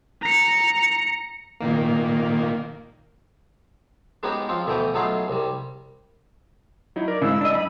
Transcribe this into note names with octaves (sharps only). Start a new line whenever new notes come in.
A#5 C#7
A#2 D#3 A#3
G#3 B3 C#4 D#4 F#4 G4
F3 C4 F4
D2 B2 E3 A3 G5 D#6
F#3 A3 B3 D#4 F4 G#4
C2 G3
F#3 D#4 E4
A#4 D5
G#2 C#3 E4 E6
D4 D#5
F#2 B5